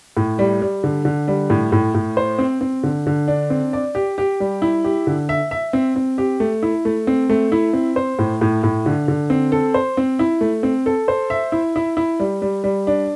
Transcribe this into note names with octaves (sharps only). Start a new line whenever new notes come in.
A2
G3
G3
D3
D3
G3
A2
A2
A2
C5
C4
C4
D3
D3
D4
C4
D5
G4
G4
G3
E4
G4
D3
E5
E5
C4
C4
G4
A3
E4
A3
C4
A3
E4
C4
C5
A2
A2
A2
D3
D3
C4
A4
C5
C4
E4
A3
C4
A4
C5
E5
E4
E4
E4
G3
G3
G3
D4